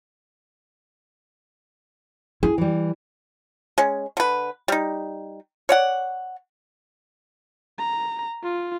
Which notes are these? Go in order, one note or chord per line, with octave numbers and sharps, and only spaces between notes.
E4 G#4
E3 G3
G#3 C#4
D3 B4
G3 D#4
C#5 D5 F#5
A#5
F4